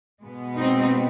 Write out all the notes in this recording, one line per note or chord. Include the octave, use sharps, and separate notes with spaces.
B2 G#3 B3
C4 D#4